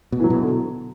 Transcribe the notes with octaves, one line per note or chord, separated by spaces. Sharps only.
B2
E3
F#3
B2
D3